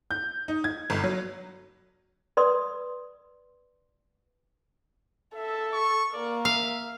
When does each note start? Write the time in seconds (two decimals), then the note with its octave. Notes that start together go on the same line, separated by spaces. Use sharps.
0.11 G6
0.48 D#4
0.64 G#6
0.90 G1
1.04 F#3
2.37 B4 D5 C6 D#6
5.36 A4 E5
5.73 C#6
6.13 A#3 A#4 D5
6.45 E5 F5